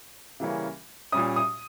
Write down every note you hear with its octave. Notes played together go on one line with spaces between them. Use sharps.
C#3 E3 G3 A#3 C#4
A#2 G3 C#4 D#6
D#6